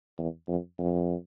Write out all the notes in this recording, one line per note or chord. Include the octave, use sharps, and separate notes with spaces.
E2
F2
F2